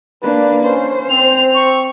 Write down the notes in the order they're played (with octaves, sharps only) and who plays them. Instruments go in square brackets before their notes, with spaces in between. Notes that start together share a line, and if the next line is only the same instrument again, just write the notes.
[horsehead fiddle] A#3 D4 [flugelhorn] B4
[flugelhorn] C#4 [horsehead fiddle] C5
[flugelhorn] C4 [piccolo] F7
[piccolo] C#6